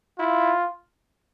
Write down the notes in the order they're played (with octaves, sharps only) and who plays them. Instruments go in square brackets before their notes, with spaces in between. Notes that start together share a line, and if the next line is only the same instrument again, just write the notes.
[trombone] E4 [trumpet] F4